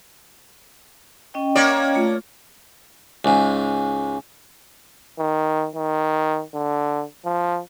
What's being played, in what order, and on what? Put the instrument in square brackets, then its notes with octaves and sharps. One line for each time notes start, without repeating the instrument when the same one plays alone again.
[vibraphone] C#4 D#5 G5
[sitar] A#3 C#5 D5
[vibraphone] A3 F4
[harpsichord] C#2 G#2
[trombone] D#3
D#3
D3
F3